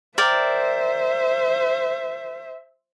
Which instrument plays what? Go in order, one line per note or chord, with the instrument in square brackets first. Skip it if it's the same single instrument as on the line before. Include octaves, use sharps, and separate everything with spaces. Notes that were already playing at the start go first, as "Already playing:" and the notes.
[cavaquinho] A#4 D5 G5 [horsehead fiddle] C5 E5